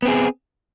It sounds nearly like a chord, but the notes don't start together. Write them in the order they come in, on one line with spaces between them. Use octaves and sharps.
B3 C4 G#4